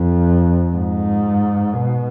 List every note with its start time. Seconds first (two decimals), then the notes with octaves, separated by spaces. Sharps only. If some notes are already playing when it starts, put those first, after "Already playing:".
Already playing: F2
0.76 G#2
1.73 B2